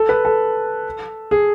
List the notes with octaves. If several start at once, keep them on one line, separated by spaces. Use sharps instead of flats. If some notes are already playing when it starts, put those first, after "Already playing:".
Already playing: A4
B4
A4
G#4